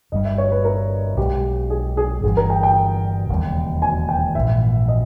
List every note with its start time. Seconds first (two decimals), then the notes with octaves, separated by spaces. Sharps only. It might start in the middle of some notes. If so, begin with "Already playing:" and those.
0.12 G1 G2 G3 D#5
0.25 E5
0.38 C#5
0.52 B4
0.65 A#4
1.17 B1 B2 G#3 G4
1.70 G#4
1.97 G#4
2.23 G1 G2 E3 G3 G#4
2.37 A#4
2.50 G5
2.63 G5
3.29 E1 D#2 C#3 G3
3.82 G#5
4.09 G5
4.35 A#1 G#2 E3 E5
4.88 D#5